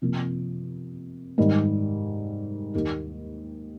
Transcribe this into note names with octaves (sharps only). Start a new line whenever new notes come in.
C3 F3 A#3
G#2 D#3 G3
D#2 D#3 A#3 D#4 G4